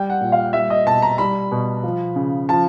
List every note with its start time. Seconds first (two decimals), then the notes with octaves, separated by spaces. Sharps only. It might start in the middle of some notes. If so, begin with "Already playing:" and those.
Already playing: G3 G5
0.10 F#5
0.21 A#2
0.32 F5
0.53 G3 E5
0.70 D#5
0.86 B2 A5
1.02 A#5
1.18 G3 B5
1.52 B2
1.84 F3
2.16 C#3
2.49 F3 A5